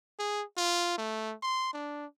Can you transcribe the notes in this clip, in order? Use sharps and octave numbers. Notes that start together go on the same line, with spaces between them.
G#4
F4
A3
C6
D4